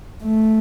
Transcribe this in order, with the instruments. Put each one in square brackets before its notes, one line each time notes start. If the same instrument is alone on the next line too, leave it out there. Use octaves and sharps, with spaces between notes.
[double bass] A3